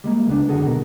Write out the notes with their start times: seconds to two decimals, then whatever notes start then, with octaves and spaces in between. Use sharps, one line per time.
0.04 G3 G#3 A#3
0.27 C#2 B3 D4
0.49 F#2 D3 F#4 G#4 A4
0.66 D2 B2 A#4